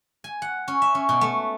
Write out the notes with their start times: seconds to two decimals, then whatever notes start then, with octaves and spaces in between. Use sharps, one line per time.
0.24 G#5
0.42 F#5
0.68 C#4
0.82 E5
0.95 C#4
1.09 B2
1.21 A3